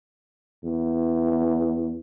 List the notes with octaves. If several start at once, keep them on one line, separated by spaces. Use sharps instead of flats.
E2